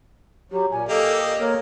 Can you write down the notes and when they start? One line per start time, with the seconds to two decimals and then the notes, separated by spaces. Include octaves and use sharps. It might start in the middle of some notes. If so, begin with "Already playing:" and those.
0.52 F#3 G4
0.71 A#2 G#5
0.89 A#3 G4 A4 D#5
1.40 A#3 A#4 C#5